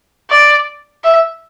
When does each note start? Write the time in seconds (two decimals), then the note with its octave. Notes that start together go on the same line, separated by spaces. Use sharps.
0.30 D5
1.04 E5